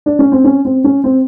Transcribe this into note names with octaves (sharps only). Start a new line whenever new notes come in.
D4
C#4
C4
C#4
C4
C#4
C4